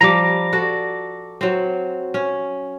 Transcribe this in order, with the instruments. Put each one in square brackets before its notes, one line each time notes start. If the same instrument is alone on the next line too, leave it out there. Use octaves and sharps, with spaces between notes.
[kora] F3 G3 [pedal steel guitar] A#5 D6
[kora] F#4 A4 D5
F#3 C4
C#4